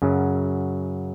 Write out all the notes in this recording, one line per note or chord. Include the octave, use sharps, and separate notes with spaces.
F#2 C#3 F#3